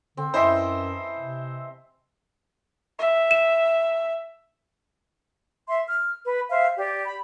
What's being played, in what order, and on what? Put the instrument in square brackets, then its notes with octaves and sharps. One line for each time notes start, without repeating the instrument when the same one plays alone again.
[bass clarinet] D3 [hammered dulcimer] C4
[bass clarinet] F#2 [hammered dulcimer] E3 E4 A5 [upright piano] C5 D#5 E5
[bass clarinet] C3
[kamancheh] E5
[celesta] E7
[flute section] E5 C6
F6
B4
C5 E5 F5
G4 D5
B5